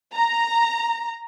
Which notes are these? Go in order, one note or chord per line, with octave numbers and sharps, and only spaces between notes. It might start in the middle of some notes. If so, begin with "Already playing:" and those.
A#5